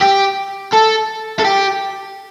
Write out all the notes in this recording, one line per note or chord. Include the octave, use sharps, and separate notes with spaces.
G4
A4
A4
G4